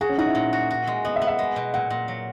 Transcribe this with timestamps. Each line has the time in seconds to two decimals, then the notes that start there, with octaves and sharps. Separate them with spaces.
0.01 F#4 G#4
0.09 C#4
0.18 D#4 F#4
0.26 E4
0.35 A#2
0.53 F#4
0.71 F#4
0.87 G#3
1.05 B3 D#5
1.16 E5
1.21 B3
1.27 E5
1.39 G#3
1.56 B2
1.74 A#2 F#5
1.90 A#2
2.08 F#3